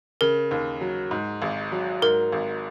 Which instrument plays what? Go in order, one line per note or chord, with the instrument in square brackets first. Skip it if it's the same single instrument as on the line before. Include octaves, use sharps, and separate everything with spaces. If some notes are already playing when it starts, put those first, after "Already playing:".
[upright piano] C#3 [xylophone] A#4
[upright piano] D#2
F#3
G#2
G#1
F#3
[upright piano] G#2 [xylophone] A#4
[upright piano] G#1